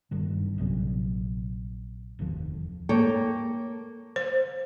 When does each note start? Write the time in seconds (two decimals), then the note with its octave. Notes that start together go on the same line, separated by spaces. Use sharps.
0.11 F#1 G2 D#3
0.58 A#1 C3 F#3 C#4
2.19 F1 D#2 A#2 F3
2.89 A#3 A4 C#5 G5
4.16 C5